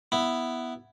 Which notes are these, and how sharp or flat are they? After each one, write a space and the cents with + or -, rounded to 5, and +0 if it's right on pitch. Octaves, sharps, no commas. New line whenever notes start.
B3 +0 E4 +0